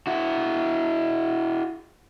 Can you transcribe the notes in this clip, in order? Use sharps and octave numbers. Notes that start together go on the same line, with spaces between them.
E4 F#4